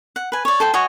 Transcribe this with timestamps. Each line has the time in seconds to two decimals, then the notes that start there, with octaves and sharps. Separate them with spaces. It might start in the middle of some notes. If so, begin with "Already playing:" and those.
0.16 F#5
0.32 B4 G#5
0.45 C#5 D5
0.60 A4 C5 G5
0.74 F#4 C#5 D#5 G#5